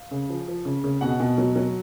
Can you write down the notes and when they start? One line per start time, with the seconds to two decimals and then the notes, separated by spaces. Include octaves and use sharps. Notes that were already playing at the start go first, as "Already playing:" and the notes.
Already playing: F5
0.11 C#3
0.29 F3
0.48 F3
0.65 C#3
0.84 C#3
1.01 B2 F#5
1.20 B2
1.38 F#3
1.56 F#3